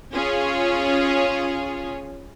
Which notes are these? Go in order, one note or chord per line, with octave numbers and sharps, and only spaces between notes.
C#4 F4 G#4 C#5